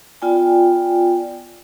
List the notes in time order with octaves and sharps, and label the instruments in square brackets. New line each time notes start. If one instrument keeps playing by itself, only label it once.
[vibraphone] B3 F4 D5 G5 G#5